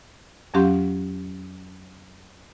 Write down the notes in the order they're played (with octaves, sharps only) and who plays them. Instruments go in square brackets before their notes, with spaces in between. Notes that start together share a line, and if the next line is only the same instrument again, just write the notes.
[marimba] F2 F#3 C#4 G4 F5 C6